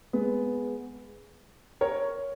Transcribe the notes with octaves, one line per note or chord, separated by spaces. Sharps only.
G#3 B3
A#4 C#5